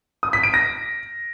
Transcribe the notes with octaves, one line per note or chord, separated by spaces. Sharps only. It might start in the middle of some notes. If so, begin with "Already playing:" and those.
D#6
B6
D7
A#6